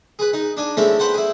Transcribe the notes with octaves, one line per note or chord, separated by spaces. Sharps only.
G#4 B4
D#4
D4 G#5
G#3 A3 C4 C#4 E4
B4 C5 F#5 G5 A5
E4 G#4